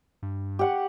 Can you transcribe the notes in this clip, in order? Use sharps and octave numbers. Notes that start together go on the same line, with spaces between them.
G2
G4 F#5 C#6